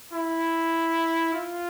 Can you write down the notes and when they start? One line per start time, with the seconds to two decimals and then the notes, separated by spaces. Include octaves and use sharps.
0.13 E4
1.33 F4